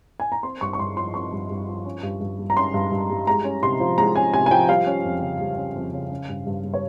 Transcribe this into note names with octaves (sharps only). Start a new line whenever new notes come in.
G#5
A#5
C4 C6
G2 C#6
C#6
G2 C6
F3 C6
C4 C#6
G2
G2
F3
C#4
G2
G2
G3
A#5
C#4 C6
G2
G2
G3
G#3 A#5
C#4
C3 C6
F3
G#3 A#5
C#4 G#5
C3 G#5
G#5
F3 G5
G3 F5
C#4
F2
C#3
G3
C#4
F2
C#3
C#4
G2
G2
G3
C#5